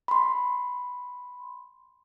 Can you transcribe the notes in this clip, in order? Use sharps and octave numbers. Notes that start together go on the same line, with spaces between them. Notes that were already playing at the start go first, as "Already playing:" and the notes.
B5 C6